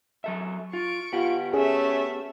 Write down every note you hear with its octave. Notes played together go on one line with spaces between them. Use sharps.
F#3 A4 E5
F4 C#6 D7
B3 F4 G4 F#5
A3 C#4 G#4 E5